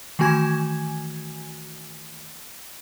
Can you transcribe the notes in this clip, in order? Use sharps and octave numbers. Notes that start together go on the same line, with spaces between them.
D#3 E3 A3 F#4 G#5 G#6